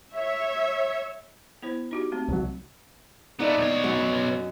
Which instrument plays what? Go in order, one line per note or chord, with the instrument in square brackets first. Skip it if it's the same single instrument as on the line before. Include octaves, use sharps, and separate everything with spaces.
[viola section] C#5 E5
[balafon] B3 E4 C5
D#4 F#4 G4
A3 C4
[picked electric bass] C2 F#3
[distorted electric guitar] A3 B3 [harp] D#4 D5 D#5
[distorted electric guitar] B1 C#5
[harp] D#4
F#2